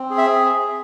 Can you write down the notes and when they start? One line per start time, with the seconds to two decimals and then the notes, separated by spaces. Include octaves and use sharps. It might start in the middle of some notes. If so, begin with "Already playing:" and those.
Already playing: C4
0.10 G#4
0.18 E5